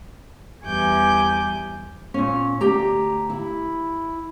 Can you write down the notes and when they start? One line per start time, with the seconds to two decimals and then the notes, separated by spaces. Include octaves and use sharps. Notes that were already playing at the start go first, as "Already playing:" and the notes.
0.64 E2 G3 G#5 D6 G6
2.14 A#2 C#4
2.61 D2 G4 A#5
3.30 E4